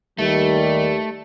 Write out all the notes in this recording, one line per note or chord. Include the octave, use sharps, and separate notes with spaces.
D#2 D#3 G3 A3